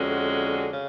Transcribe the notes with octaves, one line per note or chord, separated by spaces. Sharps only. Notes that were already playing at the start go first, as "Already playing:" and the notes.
Already playing: F2 D3 G#3 C#4 F#4
C#3